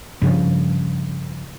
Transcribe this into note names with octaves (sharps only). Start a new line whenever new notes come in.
G2 C#3 F3